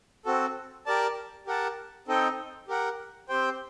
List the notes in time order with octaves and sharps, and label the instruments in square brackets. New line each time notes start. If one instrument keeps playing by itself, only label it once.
[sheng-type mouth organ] C4 F#4 A4
G4 A#4 D5 A5
G4 A#4 F#5 A5
C4 D#4 A4 D#5 G5
G4 A#4 F#5
C4 G4 C5 G5